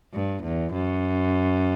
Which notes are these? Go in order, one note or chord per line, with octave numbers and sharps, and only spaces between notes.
G2
E2
F#2